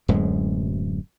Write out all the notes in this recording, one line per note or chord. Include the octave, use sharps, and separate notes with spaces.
D1 F#2 A2 G#3